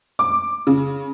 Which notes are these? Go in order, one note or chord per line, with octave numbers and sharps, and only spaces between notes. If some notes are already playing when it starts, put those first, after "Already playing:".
D6
C#3